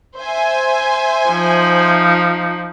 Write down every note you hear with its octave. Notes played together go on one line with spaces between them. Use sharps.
C5 E5 G#5
F3 D#4